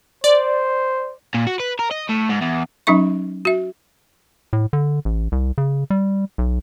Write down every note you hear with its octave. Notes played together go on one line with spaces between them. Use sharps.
C5 D5
A#2
F#4
B4
A#4
D#5
A2
G#2
E2
F#3 C#4 D#4 E5 C#6
F#4 E5
A2
D3
A1
C2
C#3
G3
B1